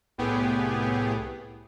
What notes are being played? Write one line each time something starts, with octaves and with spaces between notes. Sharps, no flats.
C2 A2 A3 B3 G4 G#4